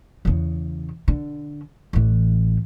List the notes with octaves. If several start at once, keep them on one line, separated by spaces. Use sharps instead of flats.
E2 C#3
D3
A1 E3